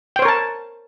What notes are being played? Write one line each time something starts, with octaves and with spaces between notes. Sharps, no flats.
A#4 C5 C#5 G5 A5